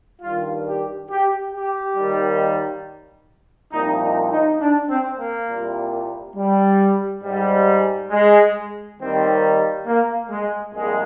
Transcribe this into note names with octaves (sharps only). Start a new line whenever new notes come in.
G2 D#3 G3 F4
G4
G4
G4
D#2 D#3 G3
C2 A#2 F3 D#4
D#4
D#4
D4
C4
A#3
C2 A#2 G3
G3
G#2 G3
G#3
D#2 D#3 G3 C4
A#3
G#3
C2 A#2 F3 G#3